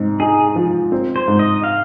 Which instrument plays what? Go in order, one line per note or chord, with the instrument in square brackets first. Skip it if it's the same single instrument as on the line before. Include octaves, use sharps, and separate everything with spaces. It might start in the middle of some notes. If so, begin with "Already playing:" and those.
Already playing: [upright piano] G#2 C4
[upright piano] D#4 [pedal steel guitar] G#4
[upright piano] F3
C4
[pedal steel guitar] C5
[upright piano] G#2
[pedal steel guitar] D#5
F5